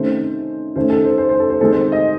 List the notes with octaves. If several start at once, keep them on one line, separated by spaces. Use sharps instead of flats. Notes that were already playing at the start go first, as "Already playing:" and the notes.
Already playing: C3 D#3 A3 C#4 C5
D#3 A3 C#4 C5
A4
C5
C5
C5
A4
C5
D#3 G#3 C4 A4
C5
D#5